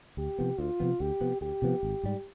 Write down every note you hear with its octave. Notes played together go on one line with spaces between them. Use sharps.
D2 G4
C3 F3 B3
D2 F4
C3 F3 B3
D2 G4
C3 F3 B3
D2 G4
C3 F3 B3
G#1
G#2 G3